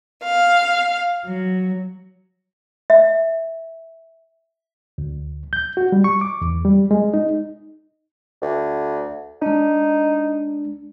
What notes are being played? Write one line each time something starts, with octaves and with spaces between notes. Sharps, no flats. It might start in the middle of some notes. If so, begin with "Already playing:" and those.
F5
F#3
E5
D2
G6
F#4
G3
C#6
D6
E2
G3
G#3
D#4
D2
G#3 D4 D#4